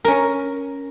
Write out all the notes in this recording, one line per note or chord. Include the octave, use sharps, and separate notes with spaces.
C#4 A#4